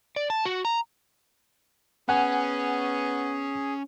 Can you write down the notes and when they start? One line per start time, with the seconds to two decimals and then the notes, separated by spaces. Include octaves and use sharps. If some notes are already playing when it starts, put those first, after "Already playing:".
0.16 D5
0.30 A5
0.45 F#4
0.65 A#5
2.09 B3 C#4 G#4 F#5 G#5